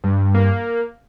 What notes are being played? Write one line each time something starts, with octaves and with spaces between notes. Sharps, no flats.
G2
A#3